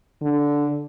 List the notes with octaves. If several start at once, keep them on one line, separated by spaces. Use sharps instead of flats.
D3